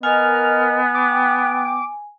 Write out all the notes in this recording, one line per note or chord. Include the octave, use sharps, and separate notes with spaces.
B3 A#4 D#5 G#5 F6
G5 D6